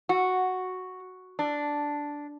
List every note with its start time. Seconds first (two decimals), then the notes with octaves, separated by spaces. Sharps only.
0.09 F#4
1.39 D4